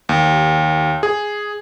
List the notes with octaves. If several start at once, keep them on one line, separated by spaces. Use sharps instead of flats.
D#2
G#4